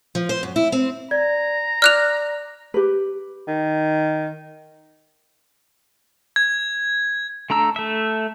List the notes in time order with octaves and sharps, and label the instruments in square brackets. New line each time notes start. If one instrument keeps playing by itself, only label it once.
[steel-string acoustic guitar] F3
C5
F#2
E4
C4
[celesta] D5 G#6 [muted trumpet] A#5
[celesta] D5 D6 [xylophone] F6 F#6 F7
[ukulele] G4 B4
[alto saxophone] D#3
[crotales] G#6
[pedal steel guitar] A3 D4 A#5 E6
A3 E5